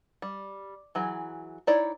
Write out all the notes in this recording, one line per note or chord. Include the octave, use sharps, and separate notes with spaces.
G3
E3 F#3 G#4
D#4 E4 C#5 D5